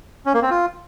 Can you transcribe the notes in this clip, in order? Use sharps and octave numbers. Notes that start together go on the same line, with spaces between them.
C#4
A#3
C4
F4